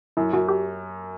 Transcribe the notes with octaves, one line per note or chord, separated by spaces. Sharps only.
F#2 E4
F#2 F#4
G4